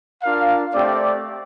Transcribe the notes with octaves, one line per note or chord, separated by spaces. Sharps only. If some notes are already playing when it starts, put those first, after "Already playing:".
D4 F4 A#4 F5
A3 C4 G4 D5